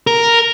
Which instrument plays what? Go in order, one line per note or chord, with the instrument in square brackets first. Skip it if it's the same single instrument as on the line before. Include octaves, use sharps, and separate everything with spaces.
[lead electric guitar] A#4